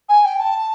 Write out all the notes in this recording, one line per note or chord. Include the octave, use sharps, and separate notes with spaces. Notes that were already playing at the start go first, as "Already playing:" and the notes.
G#5
G5
A5